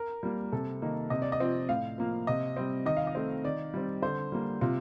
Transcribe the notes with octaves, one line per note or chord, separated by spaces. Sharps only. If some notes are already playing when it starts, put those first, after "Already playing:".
Already playing: A#4
G3 A#3
C3 A4
D#3 A#3
C3 D#5
D5
D#5
F3 C4
A2 F5
F3 A#3
C3 D#5
G3 C4
D#3 D#5
F5
D#5
A3 C4
D#3 D5
G3 C4
D3 C5
G3 A#3
C3 F4